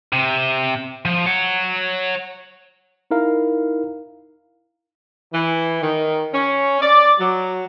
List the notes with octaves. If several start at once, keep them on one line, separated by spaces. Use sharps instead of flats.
C3
F3
C#5 F#5
D#4 E4 A#4 F5
E3
D#3
C#4
D5
F#3